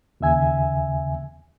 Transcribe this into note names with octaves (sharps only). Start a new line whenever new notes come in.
D#2 C#3 E5 G#5